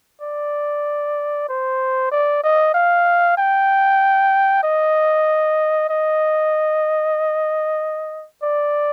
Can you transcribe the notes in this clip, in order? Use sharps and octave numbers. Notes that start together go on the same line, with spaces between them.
D5
C5
D5
D#5
F5
G5
D#5
D#5
D5